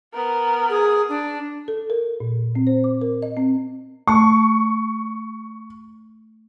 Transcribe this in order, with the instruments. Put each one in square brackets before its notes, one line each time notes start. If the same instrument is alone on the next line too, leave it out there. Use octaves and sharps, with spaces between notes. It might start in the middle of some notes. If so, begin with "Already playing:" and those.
[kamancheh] B3 A#4
[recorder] G#4
D4
[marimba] A4
A#4
A#2
C4
C5
D6
A#4
D#5
C4
[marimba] A3 A5 [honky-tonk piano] C#6